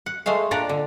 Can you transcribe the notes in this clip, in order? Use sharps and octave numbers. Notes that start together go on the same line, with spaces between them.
F#5
G#3 A3 C5 F5
A#2 D4 D5 F#5 A#5
D3